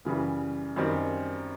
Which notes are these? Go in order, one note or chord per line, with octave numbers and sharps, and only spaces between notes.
F#2 C#3 E3 G3
F#2 D#3 G3 C4